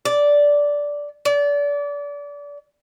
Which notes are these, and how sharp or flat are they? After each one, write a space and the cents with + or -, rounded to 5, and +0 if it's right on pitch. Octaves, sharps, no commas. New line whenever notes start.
D5 -10
D5 -30